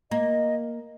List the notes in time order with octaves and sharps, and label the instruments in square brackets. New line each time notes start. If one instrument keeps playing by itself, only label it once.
[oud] A#3 [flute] D#5